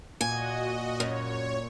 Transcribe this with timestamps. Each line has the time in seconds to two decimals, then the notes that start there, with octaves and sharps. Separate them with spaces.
0.21 A#2 F#4 D#5 G#5
1.00 F#2 C#5